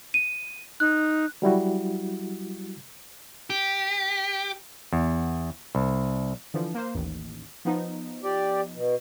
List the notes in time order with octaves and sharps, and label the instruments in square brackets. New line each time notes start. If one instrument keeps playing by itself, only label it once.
[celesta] D#7
[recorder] D#4 [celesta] F#6
[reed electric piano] F#3 G3 E4 F#4
[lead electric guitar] G4
[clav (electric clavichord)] E2
C2
[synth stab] D3 E3 F3
A#3 C5
A1 D#2
F3 B3 D#4
[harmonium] G4 D5
B2